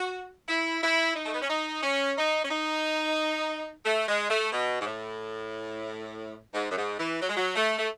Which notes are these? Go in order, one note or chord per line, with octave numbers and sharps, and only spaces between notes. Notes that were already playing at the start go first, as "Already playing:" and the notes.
Already playing: F#4
E4
E4
D#4
A3
B3
C#4
D#4
C#4
D#4
C#4
D#4
A3
G#3
A3
B2
G#2
A2
G#2
F#2
G#2
E3
F#3
G#3
F#3
A3
A3